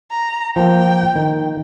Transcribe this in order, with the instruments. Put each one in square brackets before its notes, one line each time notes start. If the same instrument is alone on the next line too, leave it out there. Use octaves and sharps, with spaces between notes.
[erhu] A#5
[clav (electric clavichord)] F3 A#3 [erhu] G5
[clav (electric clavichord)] D#3